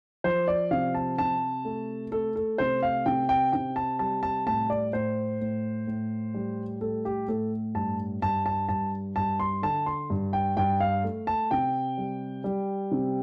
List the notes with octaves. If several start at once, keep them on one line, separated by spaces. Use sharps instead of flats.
F3 C5
D5
C3 F5
A5
C3 A5
A3
A3 A4
A4
C3 C5
F5
C3 G5
G5
C3 G5
A5
G3 A5
A5
A2 A5
D5
A2 C5
A2
A2
G3
A2 A4
G4
A2 A4
G2 A5
G2 A5
A5
G2 A5
G2 A5
C6
D3 A5
C6
G2
G5
G2 G5
F5
A3
A5
C3 G5
G3
G3
C3